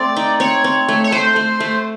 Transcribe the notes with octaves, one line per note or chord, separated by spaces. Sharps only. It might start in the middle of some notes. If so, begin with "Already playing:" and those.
Already playing: A3 C4 D5
D#4
C4 C#5
C4
A3
C#5
A3 C5
A3
A3